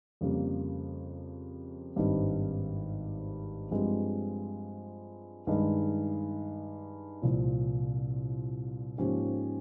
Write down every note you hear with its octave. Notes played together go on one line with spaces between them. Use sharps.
F2 C#3 G3 A#3
G#1 G2 G3 C4 D#4
G2 F3 G#3 C4 G4
G2 D#3 G#3 D#4
C2 A#2 F3
G#2 F3 A#3 C#4 G4